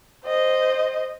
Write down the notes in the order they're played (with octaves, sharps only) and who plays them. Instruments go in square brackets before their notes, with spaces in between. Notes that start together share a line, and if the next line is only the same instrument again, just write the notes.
[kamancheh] C5 D#5